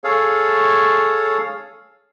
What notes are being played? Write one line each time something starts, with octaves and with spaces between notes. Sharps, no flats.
G#4 A4 C#5 F5